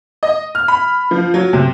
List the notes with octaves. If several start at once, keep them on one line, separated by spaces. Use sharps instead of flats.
D#5
F6
B5
F3
F#3
C3